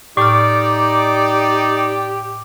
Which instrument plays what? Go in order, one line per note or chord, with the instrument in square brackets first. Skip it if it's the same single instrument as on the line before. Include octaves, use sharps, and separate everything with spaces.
[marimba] A2 F6 [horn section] D#4 D5 [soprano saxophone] G4 [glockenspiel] D6